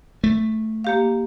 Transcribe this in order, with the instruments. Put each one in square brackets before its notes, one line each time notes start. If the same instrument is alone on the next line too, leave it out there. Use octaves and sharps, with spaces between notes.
[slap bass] A3
[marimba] A#3 G4 F5